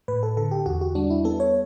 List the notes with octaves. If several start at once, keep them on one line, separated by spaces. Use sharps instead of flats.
A2 B4
A4
D3 A4
G4
E2 F#4
F#4
G3 D4
E4
B3 A4
C#5